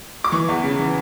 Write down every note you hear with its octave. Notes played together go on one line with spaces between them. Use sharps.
D6
E3 C#6
E2
C#3
E3